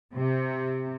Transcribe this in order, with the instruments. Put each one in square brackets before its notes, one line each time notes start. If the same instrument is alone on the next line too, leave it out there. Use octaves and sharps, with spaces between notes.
[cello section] C3